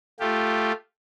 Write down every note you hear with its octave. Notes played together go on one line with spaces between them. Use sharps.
A3 F4 G4